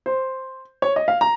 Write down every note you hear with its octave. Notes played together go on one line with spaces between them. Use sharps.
C5
C#5
D#5
F5
A#5